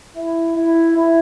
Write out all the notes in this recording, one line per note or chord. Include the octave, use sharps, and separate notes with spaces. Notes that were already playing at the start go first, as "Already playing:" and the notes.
E4
E4
E4